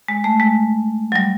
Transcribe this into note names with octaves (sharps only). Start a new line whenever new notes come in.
G#3
A3
G#3
F#3
G3